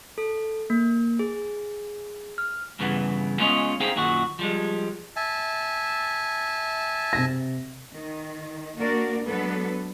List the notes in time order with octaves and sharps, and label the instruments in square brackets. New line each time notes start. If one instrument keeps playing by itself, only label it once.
[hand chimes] A4
A#3
G#4
F6
[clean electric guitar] G2 C#3 E3 B3
G#3 B3 C#4 F4 C#5 D#5
C4 D#4 G#4 C5 F5 G5
F#2 A#2 D#3 F#4
F3 G3 G#3
[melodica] E5 G#5 A5
[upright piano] C3 A#6
[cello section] D#3
A#3 D4 F#4 A#4 D5
F#3 G#3 B3 D4 A4 B4